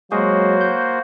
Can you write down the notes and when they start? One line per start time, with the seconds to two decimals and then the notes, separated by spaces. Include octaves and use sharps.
0.12 F#3 G#3 A#3 F#4 G#4 C5
0.61 G6